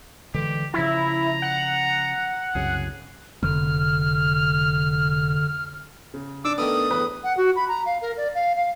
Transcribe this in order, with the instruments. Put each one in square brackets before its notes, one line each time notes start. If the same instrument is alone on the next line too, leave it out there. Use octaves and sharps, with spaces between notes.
[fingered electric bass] D3 E3 G#3 [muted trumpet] G4
[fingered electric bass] C#3 F3 [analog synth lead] E4 [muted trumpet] A#5
[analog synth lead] F#5
[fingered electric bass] C2 F#2 C#3 [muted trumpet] G#4
[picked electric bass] F1 [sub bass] D3 [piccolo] F6
[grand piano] C#3
[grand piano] D4 [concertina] D6 E6
[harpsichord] D#3 A3 B3 [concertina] D#6
[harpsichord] E2 A2 [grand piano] B4
[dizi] F#5
F#4
B5
A#5
F5
A#4
D5
F5
F5